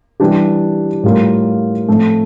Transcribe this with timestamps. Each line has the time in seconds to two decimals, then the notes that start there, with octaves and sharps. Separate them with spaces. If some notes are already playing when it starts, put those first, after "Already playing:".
0.20 E3 G3 D4 G4
1.03 A2 G3 A#3 F4
1.88 A2 F3 A3 C4